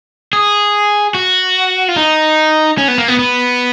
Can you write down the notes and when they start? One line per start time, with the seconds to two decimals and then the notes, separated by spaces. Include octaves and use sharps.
0.33 G#4
1.14 F#4
1.88 F4
1.96 D#4
2.78 C#4
2.88 B3
2.98 A#3
3.08 B3
3.19 B3